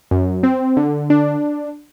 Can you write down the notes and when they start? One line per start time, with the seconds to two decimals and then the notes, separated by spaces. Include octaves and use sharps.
0.11 F#2
0.43 C4
0.77 D3
1.10 D4